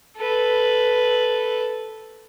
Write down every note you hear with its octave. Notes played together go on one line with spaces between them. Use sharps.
A4 B4